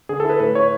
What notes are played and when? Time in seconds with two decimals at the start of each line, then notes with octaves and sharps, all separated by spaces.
0.09 D3 G#4
0.20 A4
0.25 E4
0.30 B4
0.40 A2 B4
0.55 E4 C#5